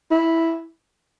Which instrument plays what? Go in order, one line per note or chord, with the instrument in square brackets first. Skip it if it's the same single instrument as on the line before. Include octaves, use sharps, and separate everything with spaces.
[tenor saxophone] E4